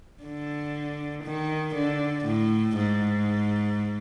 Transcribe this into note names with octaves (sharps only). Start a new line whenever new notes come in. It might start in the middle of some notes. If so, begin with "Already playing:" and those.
D3
D#3
D3
A2
G#2